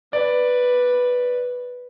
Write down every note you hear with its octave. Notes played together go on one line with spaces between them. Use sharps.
B4 D5